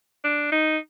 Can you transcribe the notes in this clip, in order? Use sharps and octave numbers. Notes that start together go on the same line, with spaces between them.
D4
D#4